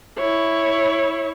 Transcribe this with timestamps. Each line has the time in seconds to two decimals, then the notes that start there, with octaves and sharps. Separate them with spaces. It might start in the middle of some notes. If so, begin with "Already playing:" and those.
0.18 E4 C#5